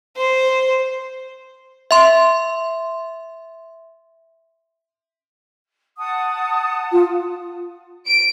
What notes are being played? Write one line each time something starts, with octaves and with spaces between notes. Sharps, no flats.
C5
E5 C6
F#5 A5 D#6
F4
D7